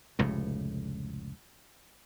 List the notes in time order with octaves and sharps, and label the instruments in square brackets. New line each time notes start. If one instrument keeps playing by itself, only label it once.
[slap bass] F1 C#2 A2